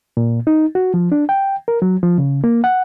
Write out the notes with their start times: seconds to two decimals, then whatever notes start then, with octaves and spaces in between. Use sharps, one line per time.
0.17 A#2
0.47 D#4
0.75 F#4
0.94 F3
1.12 D4
1.29 G5
1.68 A#4
1.82 F#3
2.03 F3
2.18 C#3
2.44 A#3
2.64 F#5